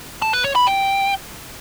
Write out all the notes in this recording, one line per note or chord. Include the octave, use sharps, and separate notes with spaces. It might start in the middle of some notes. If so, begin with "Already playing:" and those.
A5
B4
C#5
B5
G5